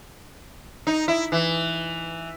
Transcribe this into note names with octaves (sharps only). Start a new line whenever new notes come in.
D#4
E4
E3